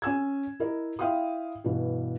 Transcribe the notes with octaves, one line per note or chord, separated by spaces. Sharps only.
C#4 G#5 E6 G#6
E4 A#4 D#5
E4 E5 F5 G5 C6 D#6
G2 B2 E3